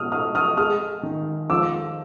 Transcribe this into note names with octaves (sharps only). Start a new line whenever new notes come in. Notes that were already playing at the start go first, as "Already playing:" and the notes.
Already playing: B2 D#6 F6
D#4 D#6 F6
D#6 F6
G#3 D#6 F6
D#3
F3 D6 E6